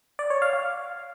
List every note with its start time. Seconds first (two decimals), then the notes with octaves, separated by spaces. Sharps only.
0.19 D5
0.30 C#5
0.42 F5
0.53 F5